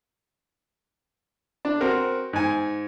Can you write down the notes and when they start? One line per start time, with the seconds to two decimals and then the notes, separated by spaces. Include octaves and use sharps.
1.65 D4
1.81 C4 F#4 A#4
2.33 G#2 G#5